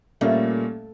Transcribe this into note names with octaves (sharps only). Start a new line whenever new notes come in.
A#2 G3 A3 A#3 C#4